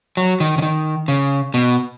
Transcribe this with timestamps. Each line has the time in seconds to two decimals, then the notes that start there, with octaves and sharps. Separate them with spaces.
0.17 F#3
0.40 D#3
0.58 C#3
0.62 D#3
1.08 C#3
1.54 B2